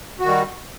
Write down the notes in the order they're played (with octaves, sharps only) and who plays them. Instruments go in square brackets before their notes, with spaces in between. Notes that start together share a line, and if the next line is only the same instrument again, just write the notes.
[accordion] F#4
D#3
G3